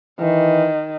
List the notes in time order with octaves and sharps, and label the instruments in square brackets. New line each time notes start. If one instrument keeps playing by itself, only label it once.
[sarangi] D#3 [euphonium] E3